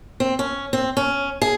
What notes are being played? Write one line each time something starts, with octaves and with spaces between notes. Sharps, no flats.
C4
C#4
C4
C#4
G#4